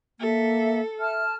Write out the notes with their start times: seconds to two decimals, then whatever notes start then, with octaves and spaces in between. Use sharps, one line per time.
0.20 A#3 A4 E5
1.00 E5 A5 F6